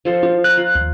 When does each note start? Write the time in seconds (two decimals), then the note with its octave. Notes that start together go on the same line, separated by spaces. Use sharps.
0.05 F3 A4 C5
0.23 F4
0.44 A#5 F#6
0.57 F4
0.75 D#2